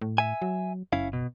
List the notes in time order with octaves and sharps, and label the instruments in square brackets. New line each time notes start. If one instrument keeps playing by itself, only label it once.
[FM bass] A2
[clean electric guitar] E5 G#5
[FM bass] F#3
[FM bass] F#1 [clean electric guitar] C#4 E4 F5
[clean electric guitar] B2